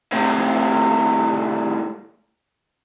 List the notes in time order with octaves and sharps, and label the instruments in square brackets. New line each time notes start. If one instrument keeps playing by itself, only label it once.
[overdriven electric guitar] A2 C3